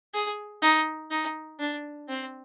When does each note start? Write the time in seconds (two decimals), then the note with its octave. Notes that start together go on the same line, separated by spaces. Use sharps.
0.13 G#4
0.62 D#4
1.11 D#4
1.60 D4
2.09 C4